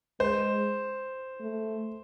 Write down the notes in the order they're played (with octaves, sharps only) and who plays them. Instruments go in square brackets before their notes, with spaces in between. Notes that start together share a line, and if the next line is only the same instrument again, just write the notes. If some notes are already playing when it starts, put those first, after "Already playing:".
[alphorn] G#3 [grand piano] C5
[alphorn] A3